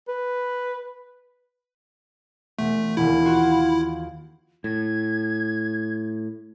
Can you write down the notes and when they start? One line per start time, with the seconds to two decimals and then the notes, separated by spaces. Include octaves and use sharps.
0.08 B4
2.59 E1 A3
2.97 E1 D#2 E4
3.25 F4 F#4 C6
4.64 A2 G#6